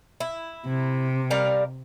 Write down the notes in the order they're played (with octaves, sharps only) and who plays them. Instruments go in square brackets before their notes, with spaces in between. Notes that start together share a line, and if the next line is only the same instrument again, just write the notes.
[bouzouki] E4
[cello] C3
[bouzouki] G3 A#4 F5